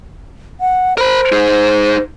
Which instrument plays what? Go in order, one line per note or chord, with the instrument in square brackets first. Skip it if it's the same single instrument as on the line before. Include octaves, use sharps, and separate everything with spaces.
[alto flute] F#5
[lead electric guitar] A#4 B5 [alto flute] C5
[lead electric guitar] D#4 G#4